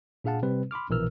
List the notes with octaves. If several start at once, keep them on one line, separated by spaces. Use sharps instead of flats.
A#2 D4 G#4 F5 F#5 A5
C3 G3 C4 B4
B5 C6 D6 F6
A#1 B2 E3 A#4 E6 F6